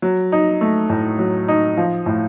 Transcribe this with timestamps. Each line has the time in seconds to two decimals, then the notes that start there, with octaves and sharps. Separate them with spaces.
0.02 F#3
0.32 D#4
0.61 A3
0.89 A2
1.19 F#3
1.48 D#4
1.77 F3
2.06 A2